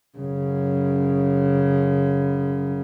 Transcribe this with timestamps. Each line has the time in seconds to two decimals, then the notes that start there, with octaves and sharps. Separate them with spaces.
0.18 F#2 C#3